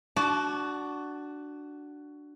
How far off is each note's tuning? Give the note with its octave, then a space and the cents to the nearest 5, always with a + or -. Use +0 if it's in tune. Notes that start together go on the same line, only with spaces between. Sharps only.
D4 +0 F#4 +10 A5 -25